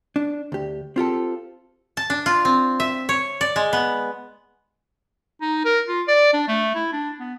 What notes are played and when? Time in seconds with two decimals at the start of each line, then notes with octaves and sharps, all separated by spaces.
0.16 D4
0.52 D2 G4
0.96 C4 F4 G4 A4
1.97 A5
2.10 D4
2.26 F4
2.45 C4
2.80 E5
3.09 C#5
3.41 D5
3.56 G#3
3.73 B3
5.42 D#4
5.65 A#4
5.88 F4
6.08 D5
6.33 D4
6.48 A3
6.75 E4
6.93 D4
7.20 B3